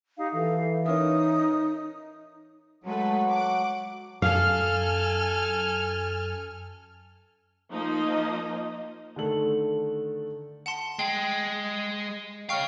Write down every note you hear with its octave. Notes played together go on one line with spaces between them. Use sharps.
D#4 G4 F5
E3 A4 F5
C#4 D#4 A#4 E5 D#6
F#3 G#3 A3 B4
F#5 D6
F#2 A4 F5 G#5 F6
F3 A#3 D#4 D#5
D3 D#3 A3 A4 F#7
F#5 A5 C6
G#3 G5
C#5 F5 G5 C#6 F6